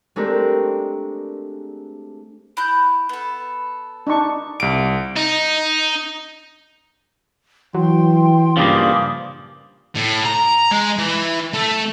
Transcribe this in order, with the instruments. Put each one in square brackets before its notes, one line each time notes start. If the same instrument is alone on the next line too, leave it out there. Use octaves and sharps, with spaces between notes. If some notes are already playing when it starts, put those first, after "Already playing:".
[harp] G#3 A3 C4 D4 G4 A#4
[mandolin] E4 F#6 G6
B3 A4
[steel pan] D4 D#4 C#6
[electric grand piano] C2 D7 [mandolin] F4
[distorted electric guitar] D#4
[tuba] E3 [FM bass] F#3 [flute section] G5 C6
[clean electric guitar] G2 A#2 F3 [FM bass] C#3 [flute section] D6 D#6
[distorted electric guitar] A2
A#5
G#3
E3
A3